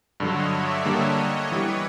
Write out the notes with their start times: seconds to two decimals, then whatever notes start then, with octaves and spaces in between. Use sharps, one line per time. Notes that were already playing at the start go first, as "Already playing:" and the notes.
0.20 G2 D3 F#3 C#5 D#5
0.53 D5 E5
0.85 D3 G3 A#3 D4 C#5 D#5
1.51 E3 G3 B3 B4 C#5